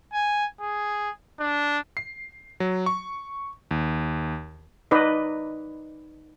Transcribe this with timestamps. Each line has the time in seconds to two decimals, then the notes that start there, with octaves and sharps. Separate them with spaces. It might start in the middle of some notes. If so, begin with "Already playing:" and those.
0.13 G#5
0.61 G#4
1.39 D4
1.97 C7
2.60 F#3
2.86 C#6
3.71 D#2
4.91 D#4 B4 D5 D#5